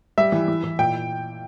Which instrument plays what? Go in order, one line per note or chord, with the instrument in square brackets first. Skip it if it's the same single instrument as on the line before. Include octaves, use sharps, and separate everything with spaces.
[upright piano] G3 E5
E3
E3
E3
A#2 G5